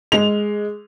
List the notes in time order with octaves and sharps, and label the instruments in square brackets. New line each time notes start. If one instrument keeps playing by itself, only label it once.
[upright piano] G#3 F7